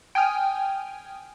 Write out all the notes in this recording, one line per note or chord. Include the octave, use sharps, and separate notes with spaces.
G5 G#5 D#6 F6